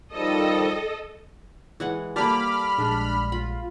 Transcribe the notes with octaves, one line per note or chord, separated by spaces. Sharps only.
D#3 F3 G3 A4 D#5
E3 G#3 F#5
G3 A#3 A4 D5 A5 B5 D6 F6
A#1 G#3 D4
F4 B5